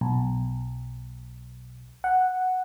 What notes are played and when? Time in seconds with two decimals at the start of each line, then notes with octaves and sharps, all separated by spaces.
0.01 B1
2.04 F#5